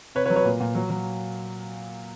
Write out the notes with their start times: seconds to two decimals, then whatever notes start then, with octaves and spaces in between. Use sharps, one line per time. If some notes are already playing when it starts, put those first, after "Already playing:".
0.15 C3 B4 C#5
0.26 B4 C#5
0.30 F#3
0.36 B4 C#5
0.45 A#2
0.60 A#2
0.75 F#3
0.90 F#3